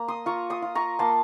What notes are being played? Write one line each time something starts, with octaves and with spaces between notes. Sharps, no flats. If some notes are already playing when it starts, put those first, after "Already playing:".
Already playing: A#3 A#5
C6 D#6
F4 A#5 C#6
C6 D#6
F4
A#5 C#6
A#3 A5 C6